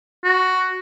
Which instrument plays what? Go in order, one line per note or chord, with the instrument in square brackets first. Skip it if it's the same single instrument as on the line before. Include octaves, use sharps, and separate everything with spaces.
[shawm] F#4